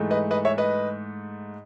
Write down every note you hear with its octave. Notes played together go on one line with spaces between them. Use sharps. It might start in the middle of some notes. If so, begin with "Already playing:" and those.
Already playing: G#2 E3 A3
B4 D#5
B4 D#5
C#5 E5
B4 D#5